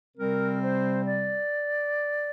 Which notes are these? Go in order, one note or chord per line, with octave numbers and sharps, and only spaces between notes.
C3 G3 C4 A#4
C5
D5